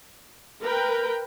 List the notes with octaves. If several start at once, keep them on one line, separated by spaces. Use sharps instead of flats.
A#4 B4 G5